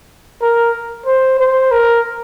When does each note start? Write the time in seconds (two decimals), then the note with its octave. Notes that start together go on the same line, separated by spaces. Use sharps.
0.42 A#4
1.06 C5
1.39 C5
1.71 A#4